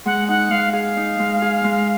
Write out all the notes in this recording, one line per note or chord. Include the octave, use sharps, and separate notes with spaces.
G#3 F#5
D#4 F#5
G#3 F5
G#4 F5
D#4
G#3
G#4
G#3